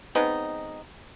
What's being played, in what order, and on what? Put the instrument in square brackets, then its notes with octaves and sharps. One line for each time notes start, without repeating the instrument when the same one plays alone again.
[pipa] G#3 B3 C4 D#4